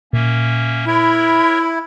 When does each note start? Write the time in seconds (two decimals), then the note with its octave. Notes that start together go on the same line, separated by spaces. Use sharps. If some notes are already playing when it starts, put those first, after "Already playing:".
0.13 A#2 A#3 C#4 E5
0.87 E4 A#4 C#5 E5 B5